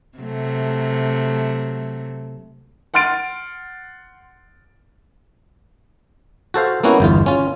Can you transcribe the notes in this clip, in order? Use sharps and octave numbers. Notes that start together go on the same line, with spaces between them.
C3 F#3 A3
F#5 C6 F6 A6 D7
F#4 A4 C5 F5
A#3 B3 C#4 E4 F#4
G1 E2 F4
C#4 F4